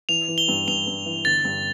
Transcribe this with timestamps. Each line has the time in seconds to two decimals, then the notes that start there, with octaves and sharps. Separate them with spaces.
0.09 E3 F7
0.28 E3
0.38 G7
0.48 G2
0.67 G2 F7
0.87 G2
1.06 E3
1.25 G1 A6
1.44 G2